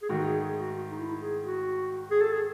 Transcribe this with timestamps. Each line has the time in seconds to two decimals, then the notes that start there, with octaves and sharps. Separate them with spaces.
0.02 G#4
0.09 G#2 D#3 A3 F#4
0.25 G#4
0.42 G#4
0.60 F#4
0.91 D#4
0.99 E4
1.20 G#4
1.43 F#4
2.11 G#4
2.21 A4
2.33 G#4